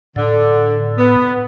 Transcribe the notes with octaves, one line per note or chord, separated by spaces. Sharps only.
A2 D3
B3